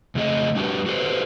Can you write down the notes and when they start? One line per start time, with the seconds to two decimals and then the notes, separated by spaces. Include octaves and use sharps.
0.15 F2 C#3 A3 G#4 D#5
0.55 G3 D4 F#4 G4 B4
0.86 F#4 G4 A4 B4 C5